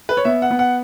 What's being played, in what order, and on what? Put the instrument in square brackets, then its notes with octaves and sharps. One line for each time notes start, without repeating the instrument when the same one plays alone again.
[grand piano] B4
C#5
B3 E5
F#5
B3
F#5